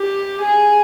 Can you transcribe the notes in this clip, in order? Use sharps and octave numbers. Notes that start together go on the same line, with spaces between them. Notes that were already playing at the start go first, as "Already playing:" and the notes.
Already playing: G4
G#4